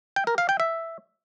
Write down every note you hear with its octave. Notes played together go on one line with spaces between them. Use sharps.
G5
A#4
F5
G5
E5